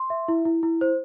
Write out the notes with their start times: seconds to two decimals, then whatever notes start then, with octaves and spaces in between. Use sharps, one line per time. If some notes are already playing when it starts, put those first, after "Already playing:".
Already playing: C6
0.10 E5
0.28 E4
0.45 E4
0.63 E4
0.81 C5